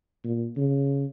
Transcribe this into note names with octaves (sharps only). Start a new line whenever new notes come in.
A#2
C#3